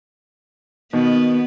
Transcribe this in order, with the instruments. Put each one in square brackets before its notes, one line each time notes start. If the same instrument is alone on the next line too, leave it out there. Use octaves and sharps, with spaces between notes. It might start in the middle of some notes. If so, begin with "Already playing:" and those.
[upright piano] B2 D#3 [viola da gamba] B3